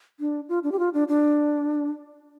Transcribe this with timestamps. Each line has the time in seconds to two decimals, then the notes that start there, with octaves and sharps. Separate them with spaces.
0.20 D4
0.49 F4
0.63 D4
0.72 G4
0.79 F4
0.94 D4
1.08 D4